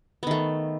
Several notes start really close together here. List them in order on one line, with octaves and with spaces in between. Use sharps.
B3 D#3 A3